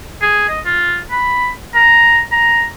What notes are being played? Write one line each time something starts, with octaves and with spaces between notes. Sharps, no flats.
G#4
D#5
F4
B5
A#5
A#5